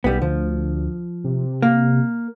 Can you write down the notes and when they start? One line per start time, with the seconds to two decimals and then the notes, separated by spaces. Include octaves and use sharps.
0.04 B1 G3 B3
0.22 D2 F3
1.24 C3
1.62 A#3